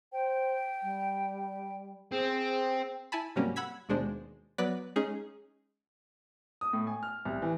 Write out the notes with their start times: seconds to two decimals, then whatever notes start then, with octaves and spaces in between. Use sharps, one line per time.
0.13 C5 G5
0.83 G3
2.12 C4 G#4
3.12 E4 G#5 A5 B5
3.36 G#2 C3 F#3 G3 A#3 C#4
3.56 F#5 B5 E6 G#6 B6
3.89 D#2 B2 G#3 D4 C5
4.58 F#3 B3 B4 D5 F#6 B6
4.96 G#3 C#4 D#4 G#4
6.61 D#6
6.73 A2
6.87 G#5
7.03 F6
7.25 C2
7.42 E3